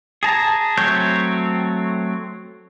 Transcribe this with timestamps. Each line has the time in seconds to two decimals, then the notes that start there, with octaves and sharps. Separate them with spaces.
0.23 G#4 A5 A#5
0.77 F#3 A3 C4 C#5 G6